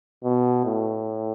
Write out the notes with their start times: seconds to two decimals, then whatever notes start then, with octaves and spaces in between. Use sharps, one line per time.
0.24 B2
0.65 A2